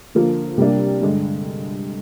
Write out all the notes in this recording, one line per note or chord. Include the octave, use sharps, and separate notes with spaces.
D3 F3 A#3
C3 G3 A#3 D4
G2 D3 G#3